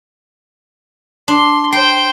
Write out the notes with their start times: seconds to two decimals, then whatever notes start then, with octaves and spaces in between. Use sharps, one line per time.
1.28 D4 C6
1.73 C5 G5 C6